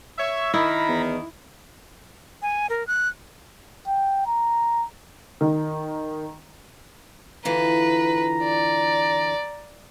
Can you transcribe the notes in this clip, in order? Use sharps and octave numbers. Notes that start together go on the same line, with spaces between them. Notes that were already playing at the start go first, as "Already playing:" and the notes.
C#5 E5
D#3 E4 A#5 B5
E2
G#5
A#4
F#6
G5
A#5
D#3
D3 E3 F4 B4 A#5
D5